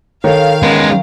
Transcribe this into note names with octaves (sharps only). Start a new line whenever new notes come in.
D#3 A4 C#5 F5
G#3 B3 C#4 D#4 A#4